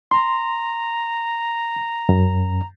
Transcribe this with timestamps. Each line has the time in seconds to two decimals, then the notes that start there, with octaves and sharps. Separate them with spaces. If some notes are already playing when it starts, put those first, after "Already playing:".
0.11 A#5 C6
2.09 F#2